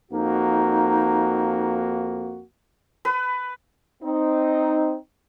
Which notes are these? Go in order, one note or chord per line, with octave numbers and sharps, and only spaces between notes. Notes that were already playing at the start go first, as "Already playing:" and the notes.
F2 A#3 D#4 F#4
B4
C4 D#4